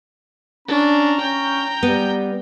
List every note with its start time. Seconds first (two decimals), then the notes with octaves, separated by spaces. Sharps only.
0.68 C#4 D4 A#5
1.21 C#4 G5 G6
1.83 G3 B3